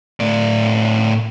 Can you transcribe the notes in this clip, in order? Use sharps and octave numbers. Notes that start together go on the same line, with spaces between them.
A2 D5